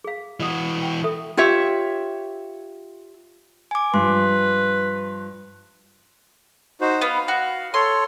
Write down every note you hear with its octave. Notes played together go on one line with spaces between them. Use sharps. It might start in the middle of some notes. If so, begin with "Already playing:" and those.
G#4 F5
E3 F#4 D#5 D#6
G5 B5
A4 E5 D#6
F4 G4 C#5 E5
G#5 D6
G2 F3 B4 C6
D#4 F#4 C5
B3 F5
F#4
A4 C#5 C6